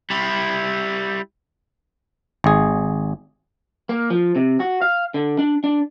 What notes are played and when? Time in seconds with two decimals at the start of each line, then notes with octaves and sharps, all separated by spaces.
0.10 G3 E4
2.44 G#1 G#4
3.89 A#3
4.10 F3
4.36 C3
4.60 F#4
4.82 F5
5.14 D3
5.39 D4
5.64 D4